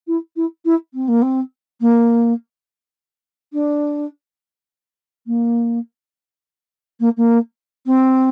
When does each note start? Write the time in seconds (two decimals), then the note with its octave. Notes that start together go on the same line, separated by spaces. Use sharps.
0.07 E4
0.36 E4
0.65 E4
0.94 C4
1.08 A#3
1.22 C4
1.80 A#3
3.53 D4
5.26 A#3
7.00 A#3
7.17 A#3
7.86 C4